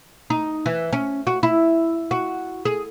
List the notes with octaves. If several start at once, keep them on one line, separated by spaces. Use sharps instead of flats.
D#4
E3
C#4
F#4
E4
F#4
G#4